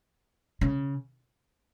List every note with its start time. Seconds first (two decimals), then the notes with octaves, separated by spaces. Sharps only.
0.61 C#3